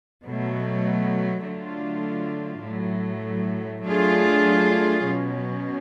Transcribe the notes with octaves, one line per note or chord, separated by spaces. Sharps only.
B2 F#3 A3
D3 F#3 A3 D4 F4
A2 F#3 A3
F#3 A3 D4 F4 G#4
B2 F#3 C#4